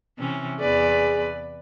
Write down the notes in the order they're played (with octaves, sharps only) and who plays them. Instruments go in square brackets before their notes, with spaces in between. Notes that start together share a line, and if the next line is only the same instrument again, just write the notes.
[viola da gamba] C3 E3 C#4
[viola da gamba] E2 B4 D5 [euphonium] G#4